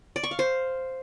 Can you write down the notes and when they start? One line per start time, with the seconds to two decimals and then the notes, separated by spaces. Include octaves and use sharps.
0.16 D5
0.24 C#6
0.31 F5
0.39 C5